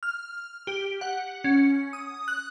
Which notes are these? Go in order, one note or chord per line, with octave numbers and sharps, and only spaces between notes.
F6
G4
F#5
C#4
D#6
F#6